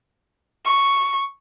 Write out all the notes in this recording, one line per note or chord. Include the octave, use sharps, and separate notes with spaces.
C#6